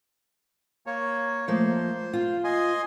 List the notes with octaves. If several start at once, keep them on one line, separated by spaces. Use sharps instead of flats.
A#3 C#5
F3 A3 A#3 C5
F4
D#5 G#5 C6